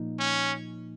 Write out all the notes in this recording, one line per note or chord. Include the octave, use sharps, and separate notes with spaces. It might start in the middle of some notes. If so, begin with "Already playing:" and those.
Already playing: A#2 F3 A#3 D#4
C#4